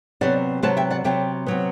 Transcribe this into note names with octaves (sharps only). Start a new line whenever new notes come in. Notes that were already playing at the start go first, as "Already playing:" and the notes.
C3 F#3 B3 D5 F#5
C3 F#3 B3 F#5 A5
E5 G5
D5 F#5
C3 F#3 B3 E5 G5
C3 F#3 B3